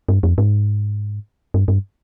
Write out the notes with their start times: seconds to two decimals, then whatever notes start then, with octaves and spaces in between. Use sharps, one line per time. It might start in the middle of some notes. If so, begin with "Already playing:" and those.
0.09 G2
0.23 F2
0.38 G#2
1.54 G2
1.68 G2